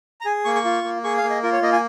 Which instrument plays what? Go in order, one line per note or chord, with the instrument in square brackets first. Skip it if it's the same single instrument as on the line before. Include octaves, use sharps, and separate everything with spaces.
[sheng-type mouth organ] A#5
G#4 G#5
A#3 C#6
C#6
F4
A#3
G#4 C#6
F5
A#3
D#5
F4 A#4
C#5
A#3 D#5
G#5